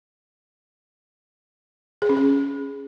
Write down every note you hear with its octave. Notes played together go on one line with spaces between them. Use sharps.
G#4
C#4
G#4